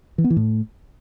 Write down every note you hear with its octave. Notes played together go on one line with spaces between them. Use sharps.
E3
B3
E3
A2